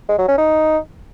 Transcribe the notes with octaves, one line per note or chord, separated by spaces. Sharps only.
G#3
F#3
C#4
D#4